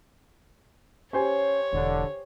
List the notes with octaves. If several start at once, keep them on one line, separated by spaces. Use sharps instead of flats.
C#4 G4 C5 C#5 G#5
E1 D3